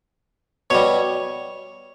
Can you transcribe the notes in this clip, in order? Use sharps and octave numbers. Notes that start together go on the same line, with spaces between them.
B2 G3 C#5